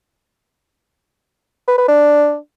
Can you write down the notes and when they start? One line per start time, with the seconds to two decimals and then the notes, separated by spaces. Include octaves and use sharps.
1.68 B4
1.78 B4
1.88 D4